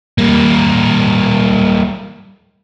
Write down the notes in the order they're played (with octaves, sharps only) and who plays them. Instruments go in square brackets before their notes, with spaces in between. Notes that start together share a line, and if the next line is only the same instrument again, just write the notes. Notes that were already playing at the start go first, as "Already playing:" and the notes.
[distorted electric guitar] G3 A#3